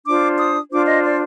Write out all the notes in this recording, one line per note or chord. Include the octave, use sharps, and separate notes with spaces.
D4 F4 C5 D6
D#6
D4 F4 C5 D6
D#5
D5